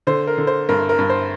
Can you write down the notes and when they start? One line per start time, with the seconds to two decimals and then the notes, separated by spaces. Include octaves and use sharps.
0.07 D3 C5
0.27 A#4
0.38 D3
0.47 C5
0.69 G2 A#4
0.89 A#4
0.99 G2
1.10 C5